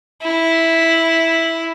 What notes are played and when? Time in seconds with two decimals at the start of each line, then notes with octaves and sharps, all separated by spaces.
0.22 E4